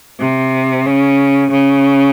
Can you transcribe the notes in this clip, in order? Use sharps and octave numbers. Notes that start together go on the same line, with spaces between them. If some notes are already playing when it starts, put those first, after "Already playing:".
C3
C#3
C#3